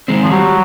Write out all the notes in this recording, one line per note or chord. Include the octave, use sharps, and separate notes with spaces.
D#3 G#3 C4
F3
F#3 G3